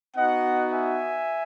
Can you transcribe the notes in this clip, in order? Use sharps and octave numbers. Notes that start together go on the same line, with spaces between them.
B3 D#4 F#4 D#5 F#5
E5 G#5